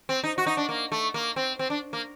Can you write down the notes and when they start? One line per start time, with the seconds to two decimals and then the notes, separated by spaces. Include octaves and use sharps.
0.09 C4
0.24 D#4
0.38 F#4
0.47 D#4
0.57 D4
0.69 A#3
0.92 A3
1.14 A#3
1.36 C4
1.59 C4
1.70 D4
1.93 A#3